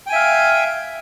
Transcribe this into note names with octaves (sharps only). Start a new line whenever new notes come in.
E5 F5 G5 G#5